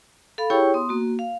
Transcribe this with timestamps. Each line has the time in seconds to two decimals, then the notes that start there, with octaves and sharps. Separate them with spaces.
0.38 A4 F5 B5
0.50 E4 G4 G#4 C#5 G5 C#6
0.74 B3 C6 D#6
0.89 A#3 F#4
1.19 F5